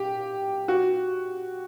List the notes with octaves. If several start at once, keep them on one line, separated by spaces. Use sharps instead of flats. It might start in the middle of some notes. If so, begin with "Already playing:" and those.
Already playing: G4
F#4